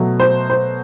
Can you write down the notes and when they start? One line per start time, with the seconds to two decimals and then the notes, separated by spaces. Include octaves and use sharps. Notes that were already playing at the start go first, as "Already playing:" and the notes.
Already playing: B2 F#3 A3
0.20 C5
0.50 C5